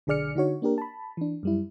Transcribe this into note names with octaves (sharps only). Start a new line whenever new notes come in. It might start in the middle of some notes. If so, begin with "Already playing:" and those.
B1 D3 G#4 D5 F6 C#7
D3 D#4 F#4 C#5
A#3 D4 G4 A#4
A5 B5
E3 D4
F#2 G3 E4